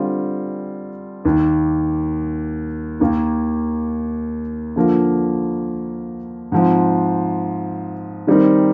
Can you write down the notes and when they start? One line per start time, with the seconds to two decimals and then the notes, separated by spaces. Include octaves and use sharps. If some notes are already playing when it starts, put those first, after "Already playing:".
Already playing: D3 G3 C4 F4
1.25 D#2 D#3 A#3
3.00 D#2 D#3 A#3 D#4
4.76 D3 F3 A#3 F4 A#4
6.52 G#2 F3 C4
8.27 D#3 G3 C4 D#4 A#4